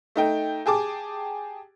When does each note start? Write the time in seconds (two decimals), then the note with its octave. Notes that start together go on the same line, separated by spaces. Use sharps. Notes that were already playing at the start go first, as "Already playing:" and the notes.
0.16 A3 D#4 G5
0.66 G4 G#4 A5 D6